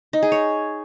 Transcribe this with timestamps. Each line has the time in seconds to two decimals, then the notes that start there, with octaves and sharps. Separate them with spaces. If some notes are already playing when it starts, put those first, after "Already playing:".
0.13 D#4
0.22 G#4
0.32 C#5